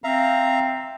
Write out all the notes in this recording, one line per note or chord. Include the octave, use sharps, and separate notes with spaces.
C4 E5 F5 A#5